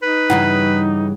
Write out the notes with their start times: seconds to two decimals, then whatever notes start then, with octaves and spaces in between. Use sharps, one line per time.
0.03 D#4 B4
0.30 G2 C#3 E3 E4 F#5